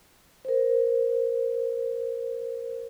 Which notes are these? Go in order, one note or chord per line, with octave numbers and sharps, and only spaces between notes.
A#4 C5